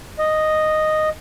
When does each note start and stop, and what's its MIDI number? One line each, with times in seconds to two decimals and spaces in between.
0.19 1.09 75